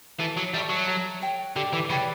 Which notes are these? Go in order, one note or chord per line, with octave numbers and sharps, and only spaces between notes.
E3 A4
F#3
G3 E5 A5 C#6
F#3
A4
C#5 G5
D3 G4
E3
C#3 B4 D5 G5